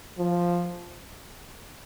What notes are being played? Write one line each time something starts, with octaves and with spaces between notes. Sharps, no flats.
F3